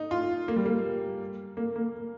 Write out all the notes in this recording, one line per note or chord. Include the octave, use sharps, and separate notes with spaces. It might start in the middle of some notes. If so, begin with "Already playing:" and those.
Already playing: D#4
F4
A#3
G3
A#3
A#3
A#3